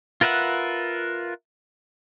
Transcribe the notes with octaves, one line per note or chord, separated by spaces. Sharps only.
F4 A#4 B4 E5 F#5